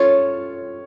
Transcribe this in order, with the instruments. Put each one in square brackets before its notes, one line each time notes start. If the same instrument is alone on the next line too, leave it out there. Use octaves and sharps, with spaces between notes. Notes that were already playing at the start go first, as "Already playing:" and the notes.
Already playing: [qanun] C#4 F4 A4 [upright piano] C#5